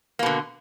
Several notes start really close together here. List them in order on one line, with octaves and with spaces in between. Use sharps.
A#3 B2 D3